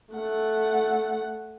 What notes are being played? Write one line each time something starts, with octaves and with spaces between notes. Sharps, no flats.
A3 F#5